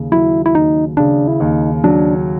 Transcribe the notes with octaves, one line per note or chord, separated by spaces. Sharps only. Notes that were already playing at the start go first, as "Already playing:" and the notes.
Already playing: D#2 C#3
F#3 E4
E4
D#2 D#4
C#3 D4
E4
D#2 D#4
F#3 D4